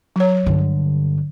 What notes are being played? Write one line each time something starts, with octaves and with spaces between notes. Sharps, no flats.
F#3 C#5
G2 D3